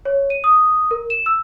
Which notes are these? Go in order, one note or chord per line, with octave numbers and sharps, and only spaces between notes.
C#5
D#7
D#6
A#4
E7
E6